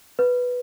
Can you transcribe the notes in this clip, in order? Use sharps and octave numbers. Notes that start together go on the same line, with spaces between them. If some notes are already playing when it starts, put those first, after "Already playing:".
B4